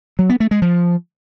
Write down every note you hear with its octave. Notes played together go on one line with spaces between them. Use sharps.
F#3
B3
A3
G#3
F3